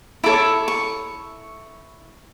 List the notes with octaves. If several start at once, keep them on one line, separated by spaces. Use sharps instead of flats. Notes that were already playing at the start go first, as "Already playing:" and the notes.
E4 A4 C#5 D6
C#6